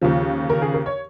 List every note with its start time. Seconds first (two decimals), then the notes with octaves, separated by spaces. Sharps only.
0.01 D#2 C#3 F3
0.50 A#4
0.62 G#4
0.74 A#4
0.86 C#5